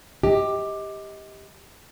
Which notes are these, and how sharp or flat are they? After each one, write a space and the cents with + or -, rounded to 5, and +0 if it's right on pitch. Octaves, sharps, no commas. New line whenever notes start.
G4 +10 D#5 +25